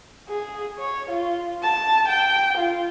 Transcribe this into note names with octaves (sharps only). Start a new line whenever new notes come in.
G#4
C#5
F4
A5
G5
F4